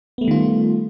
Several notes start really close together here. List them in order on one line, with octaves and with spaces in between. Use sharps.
B3 A3 G3 D#3 F4